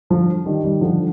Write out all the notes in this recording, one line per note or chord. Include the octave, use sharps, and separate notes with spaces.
D3 F3
D#3 G3
D#3 G3
D3 F3